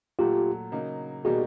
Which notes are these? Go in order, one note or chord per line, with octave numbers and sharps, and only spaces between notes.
A#2 F#3 A3 F4 G4
C#3 F#3 A#3 D#4
B2 G3 A#3 D#4 F#4 G#4